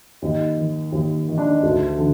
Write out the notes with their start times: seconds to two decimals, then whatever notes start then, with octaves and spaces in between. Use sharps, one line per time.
0.22 D#2 D#4
0.57 D#3
0.92 D#2
1.28 D#3
1.38 D4
1.50 D#4
1.63 D2 F#4
1.98 D3